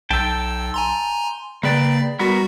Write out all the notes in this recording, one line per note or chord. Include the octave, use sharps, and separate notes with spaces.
B1 G5 A5 E6
G#5 A#5 C6
C#3 A#3 B4 D5 G5 A6
G3 B3 F#4 A#4